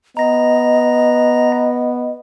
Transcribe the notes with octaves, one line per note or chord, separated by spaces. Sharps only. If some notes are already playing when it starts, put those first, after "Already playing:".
B3 D#5 A#5 A#6